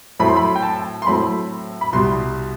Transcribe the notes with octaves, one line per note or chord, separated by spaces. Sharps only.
A2 F#3 A3 C4 B5
C6
B5
G5
A5
C6
A2 F#3 A3 C4 B5
B5
C2 B2 G3 C6